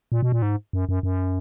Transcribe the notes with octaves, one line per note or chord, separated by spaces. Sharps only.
A#2
B2
A#2
G#2
F#2
F#2
F#2